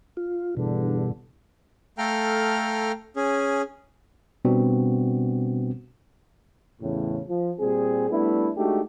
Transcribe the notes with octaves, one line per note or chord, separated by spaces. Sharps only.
F4
E2 G2 B2 D3
A3 A4 F5 G5 A#5 F6
C#4 G#4
B2 G3 B3 C4 D4 F#4
E2 A2 C#3
F3
A#2 G3 C4 G#4
G3 A3 B3 D4 E4
G#3 A3 D4 D#4 F#4 G4